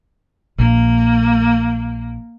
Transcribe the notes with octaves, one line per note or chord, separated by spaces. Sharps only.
A#1 A#3